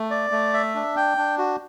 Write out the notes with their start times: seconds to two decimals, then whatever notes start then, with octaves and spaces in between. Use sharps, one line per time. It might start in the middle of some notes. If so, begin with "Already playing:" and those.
Already playing: A3
0.11 D5
0.32 A3
0.53 E5
0.75 D4
0.97 G5
1.17 D4
1.38 F#4